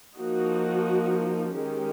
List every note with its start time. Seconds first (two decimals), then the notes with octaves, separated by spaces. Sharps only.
0.16 F3 A#3 D#4 F#4
1.54 D#3 G#3 C#4 G4